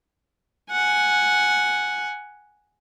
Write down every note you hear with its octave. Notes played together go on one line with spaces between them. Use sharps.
F#5 G#5